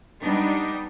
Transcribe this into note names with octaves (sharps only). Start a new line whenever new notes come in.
G3 B3 D4 D#4